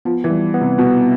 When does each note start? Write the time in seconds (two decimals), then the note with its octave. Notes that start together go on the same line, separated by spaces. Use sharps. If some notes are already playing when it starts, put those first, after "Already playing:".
0.05 F3 B3
0.24 E3
0.30 G3
0.54 B3
0.61 C3
0.78 B2 B3